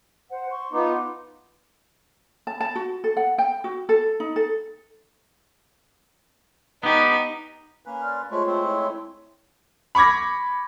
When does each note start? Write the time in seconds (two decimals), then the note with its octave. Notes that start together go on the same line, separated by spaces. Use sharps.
0.30 C5 F#5
0.51 C6 C#6
0.72 F3 B3 D#4 B4 C6 D6
2.47 A5
2.60 A5
2.75 F#4
3.04 A4
3.17 F#5
3.38 G5
3.64 F#4
3.89 A4
4.20 D#4
4.36 A4
6.83 B3 D#4 G4
7.86 A#3 C#4 B4
8.02 D5 C6 F6
8.31 G#3 A3 F4 C5 C#5
8.47 G#3 A3 C4
8.66 E4 C#5
9.95 B5 C#6 D6 G#6 A#6